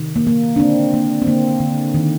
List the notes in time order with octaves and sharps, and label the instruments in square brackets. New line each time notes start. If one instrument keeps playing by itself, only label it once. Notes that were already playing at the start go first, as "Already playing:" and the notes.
Already playing: [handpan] C3 D#3
A#3
A#3
D4
D3 C4
A#3
C4
D3 A#3
D3
D#3